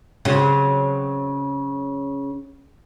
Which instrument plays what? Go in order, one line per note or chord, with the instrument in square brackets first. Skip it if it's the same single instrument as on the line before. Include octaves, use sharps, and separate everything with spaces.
[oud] C#3 F#3 C4